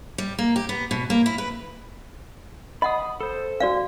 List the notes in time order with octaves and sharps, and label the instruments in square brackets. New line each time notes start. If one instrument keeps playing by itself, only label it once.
[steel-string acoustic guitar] G3
A#3
G4
B3
B2
A#3
E4
B4
[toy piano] D#5 F#5 [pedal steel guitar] B5 D#6
[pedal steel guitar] A4 C5
[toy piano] F#4 D5 F5